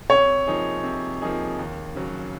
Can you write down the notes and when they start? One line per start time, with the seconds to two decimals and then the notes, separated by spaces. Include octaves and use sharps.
0.09 C3 C#5
0.47 F3 A#3 D#4 G#4
0.84 C3
1.22 F3 A#3 D#4 G#4
1.59 D#2
1.95 C#3 F#3